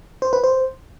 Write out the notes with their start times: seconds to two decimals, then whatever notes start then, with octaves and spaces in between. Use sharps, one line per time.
0.22 C5
0.33 B4
0.44 C5